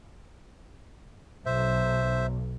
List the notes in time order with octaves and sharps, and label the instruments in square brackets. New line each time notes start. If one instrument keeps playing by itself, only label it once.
[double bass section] B1 [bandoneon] C5 E5